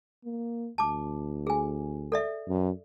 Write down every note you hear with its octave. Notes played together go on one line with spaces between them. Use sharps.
A#3
D2 A5 D6
G#4 G#5
A4 D5 E5
F#2